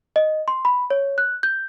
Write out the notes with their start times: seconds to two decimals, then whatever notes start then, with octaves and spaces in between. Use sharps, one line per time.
0.16 D#5
0.48 C6
0.65 B5
0.90 C#5
1.18 F#6
1.43 G6